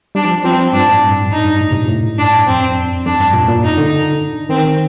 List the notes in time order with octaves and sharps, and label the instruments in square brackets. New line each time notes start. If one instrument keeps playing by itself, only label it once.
[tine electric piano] G3 [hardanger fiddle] D4
[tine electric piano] F3
[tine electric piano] F3 [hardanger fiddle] C4
[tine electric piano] G2 [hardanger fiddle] D4
[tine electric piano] A2
G2
[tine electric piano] F2 [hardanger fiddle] D#4
[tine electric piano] G2
A2
C3
A#2
A2
[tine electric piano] G2 [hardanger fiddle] D4
[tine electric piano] F2 [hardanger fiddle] C4
[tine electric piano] F2 [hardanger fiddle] D4
[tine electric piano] G2
A#2
A#2
[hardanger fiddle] D#4
[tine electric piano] D3
[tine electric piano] D#3 [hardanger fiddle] C4